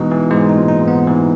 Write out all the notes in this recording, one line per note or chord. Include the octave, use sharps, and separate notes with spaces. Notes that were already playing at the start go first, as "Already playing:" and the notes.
Already playing: B2 E3 G#3 D#4
E3
G#2 G#3
D#4
A#2
D#4
G#2
B3
E3